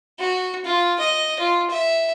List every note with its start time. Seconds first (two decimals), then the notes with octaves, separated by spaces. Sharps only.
0.19 F#4
0.65 F4
0.99 D#5
1.39 F4
1.70 E5